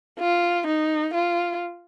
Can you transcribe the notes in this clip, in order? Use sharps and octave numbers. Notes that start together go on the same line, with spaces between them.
F4
D#4
F4